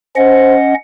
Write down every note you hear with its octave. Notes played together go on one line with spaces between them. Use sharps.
C#4 C5 D#5 F#5